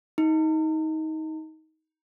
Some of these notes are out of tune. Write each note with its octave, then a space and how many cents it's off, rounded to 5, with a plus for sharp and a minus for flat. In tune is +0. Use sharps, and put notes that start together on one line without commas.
D#4 +20